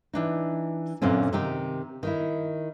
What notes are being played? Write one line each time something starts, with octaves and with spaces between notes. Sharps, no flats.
E3 D4 D#4
F#2 A#2 D3 C4 C#4
C3 D#3 D#4 G4
D#3 D#4 E4